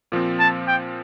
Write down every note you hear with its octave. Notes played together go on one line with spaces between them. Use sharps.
A#2 F3 C4
A5
G5